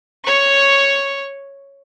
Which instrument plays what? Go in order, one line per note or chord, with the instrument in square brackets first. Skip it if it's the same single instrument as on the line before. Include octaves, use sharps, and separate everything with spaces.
[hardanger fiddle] C#5 C#6